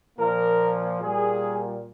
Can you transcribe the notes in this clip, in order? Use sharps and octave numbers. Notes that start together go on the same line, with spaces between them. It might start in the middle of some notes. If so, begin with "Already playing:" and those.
A#2 F3 A#3 A#4
A#2 G3 A#3 G#4